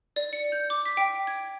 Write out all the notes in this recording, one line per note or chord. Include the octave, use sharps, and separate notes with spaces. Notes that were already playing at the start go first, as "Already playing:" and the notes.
D5
C#7
G6
D6
B6
G5
G#6